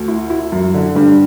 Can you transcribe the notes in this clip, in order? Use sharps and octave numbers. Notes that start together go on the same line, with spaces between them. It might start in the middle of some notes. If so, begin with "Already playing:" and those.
Already playing: D2
E4
E4
F#2
D3
G2 G3